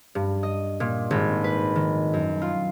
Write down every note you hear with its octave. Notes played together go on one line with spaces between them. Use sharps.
G2
D#5
A#2
G#1
B4
D#3
F#2
F4